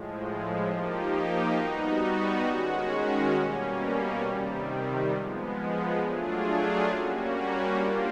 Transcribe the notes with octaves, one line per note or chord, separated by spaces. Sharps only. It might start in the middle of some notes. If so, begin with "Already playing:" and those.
Already playing: A2 F3 G#3
F3 A#3 D#4 G4
G3 B3 D#4 F#4
D#3 G#3 C#4 F#4
B2 G3 A#3 C#4
C3 D#3 G3
F3 G#3 B3
F#3 A3 D4 F4 G#4
G3 A#3 C#4 F#4
G3 A#3 D4 F4